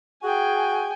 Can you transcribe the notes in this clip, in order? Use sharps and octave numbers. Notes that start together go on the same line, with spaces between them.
F#4 G#4 G5 G#5